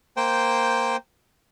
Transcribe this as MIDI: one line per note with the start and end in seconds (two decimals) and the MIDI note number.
0.17 0.96 58
0.17 0.96 72
0.17 0.96 79